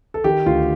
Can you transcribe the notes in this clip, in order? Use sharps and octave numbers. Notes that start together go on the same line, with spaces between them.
A4
D#3 G4
D2 F4